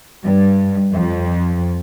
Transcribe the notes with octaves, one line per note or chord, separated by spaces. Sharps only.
G2
F2